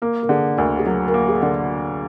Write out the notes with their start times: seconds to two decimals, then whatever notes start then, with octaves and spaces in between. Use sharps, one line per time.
0.02 A#3 A#4
0.23 A#4
0.29 D3 G#4
0.57 D2 A#4
0.79 G#4
0.86 F#3 A#4
1.08 A#4
1.14 A#3
1.28 G#4
1.41 D3 A#4